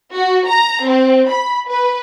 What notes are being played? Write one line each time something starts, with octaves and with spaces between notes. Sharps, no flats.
F#4
A#5
C4
B5
B4